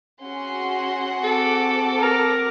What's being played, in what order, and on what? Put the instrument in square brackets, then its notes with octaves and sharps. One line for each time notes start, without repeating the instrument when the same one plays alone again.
[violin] C#4 C6 [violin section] F#4 G#4 F#5
[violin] C4 D6 [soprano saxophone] A4
[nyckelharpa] A#4